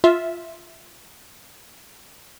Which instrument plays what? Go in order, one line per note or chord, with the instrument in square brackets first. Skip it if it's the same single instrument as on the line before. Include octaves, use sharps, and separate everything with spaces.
[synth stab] F4 E5